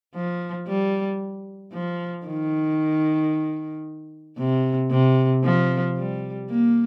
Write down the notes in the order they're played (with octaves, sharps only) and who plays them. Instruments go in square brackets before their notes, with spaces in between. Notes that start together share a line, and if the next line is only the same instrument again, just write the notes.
[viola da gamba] F3
G3
F3
D#3
C3
C3
F3
G3
A#3